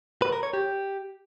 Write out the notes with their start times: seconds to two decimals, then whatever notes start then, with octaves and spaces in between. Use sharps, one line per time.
0.22 B4
0.33 A#4
0.43 C#5
0.53 G4